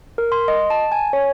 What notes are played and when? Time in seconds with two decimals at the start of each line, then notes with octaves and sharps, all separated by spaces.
0.18 A#4
0.32 C6
0.48 D#5
0.70 A5
0.92 G#5
1.13 C#5